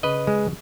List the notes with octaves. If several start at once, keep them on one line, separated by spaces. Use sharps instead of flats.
C#3 B4 D#5
G#3